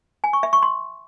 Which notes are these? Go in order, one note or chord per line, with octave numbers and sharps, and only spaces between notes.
G#5
C#6
E5
C#6
C6